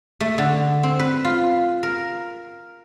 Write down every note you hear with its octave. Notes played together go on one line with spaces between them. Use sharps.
A3
D3
C4
B4
F4
A#4